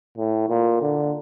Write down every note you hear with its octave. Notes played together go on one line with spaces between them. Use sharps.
A2
A#2
D3